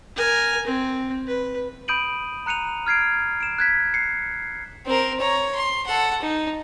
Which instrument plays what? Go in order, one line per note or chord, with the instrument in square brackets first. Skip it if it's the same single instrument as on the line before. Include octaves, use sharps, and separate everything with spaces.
[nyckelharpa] A#4 G#5
C4
B4
[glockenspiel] B5 D#6 G6 D7 D#7 F#7
A#5 F#6 C#7 D#7 F7
F6 G#6 C7 D7
D7 E7
F#6 G#6 B6
C7 C#7
[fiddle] C4 A#4
C#5 A#5
C6
A4 F#5
D#4